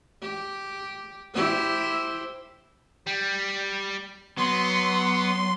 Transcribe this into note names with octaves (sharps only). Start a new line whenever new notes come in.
G4
E4 G4 C5
G3
F#3 B3 C6